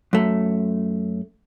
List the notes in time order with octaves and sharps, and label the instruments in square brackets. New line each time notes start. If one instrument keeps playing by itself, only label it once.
[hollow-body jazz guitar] F#2 A3